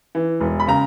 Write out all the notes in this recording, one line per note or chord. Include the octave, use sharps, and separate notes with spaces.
E3
E1
B5
C#3 A#5